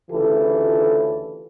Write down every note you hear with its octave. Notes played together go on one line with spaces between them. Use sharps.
D2 C#3 E3 F4 G4 A4